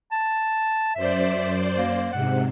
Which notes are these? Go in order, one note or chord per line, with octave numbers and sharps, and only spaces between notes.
A5
F#2 C5 D5 E5
A#3
G#2 C3 F#5